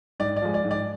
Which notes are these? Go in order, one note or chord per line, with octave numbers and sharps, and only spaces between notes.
G#2 D5
D5
F3 G#3
D5
G#2
D5